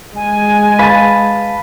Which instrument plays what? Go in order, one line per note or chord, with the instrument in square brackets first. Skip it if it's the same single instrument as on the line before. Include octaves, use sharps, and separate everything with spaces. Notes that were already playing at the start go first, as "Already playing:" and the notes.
[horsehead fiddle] G#3 [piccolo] G#5
[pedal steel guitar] B4 A5 [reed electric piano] F5